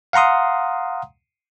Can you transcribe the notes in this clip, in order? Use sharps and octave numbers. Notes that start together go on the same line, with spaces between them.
F5 F#5 A#5 C6 D#6